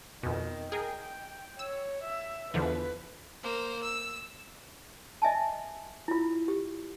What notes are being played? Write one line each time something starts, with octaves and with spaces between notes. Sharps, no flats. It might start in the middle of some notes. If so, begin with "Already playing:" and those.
F2 B2 D#3
G#4 A#4 G5
G5
C#5 E6
E5
E2 D3 F3 B4
A#3 C5
E6
D#5 E5 G#5 A5
E4 F4
G4